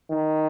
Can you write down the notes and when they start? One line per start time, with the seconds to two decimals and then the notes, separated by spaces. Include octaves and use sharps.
0.11 D#3